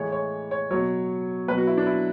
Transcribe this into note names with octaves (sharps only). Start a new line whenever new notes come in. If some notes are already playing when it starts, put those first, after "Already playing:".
Already playing: A2 E3 G#3 C#5
C#5
C#5
B2 F#3 C#5
B2 F#3 B4
F#4
E4
D4
E4